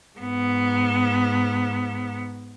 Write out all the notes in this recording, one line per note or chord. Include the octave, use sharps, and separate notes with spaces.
G#2 B3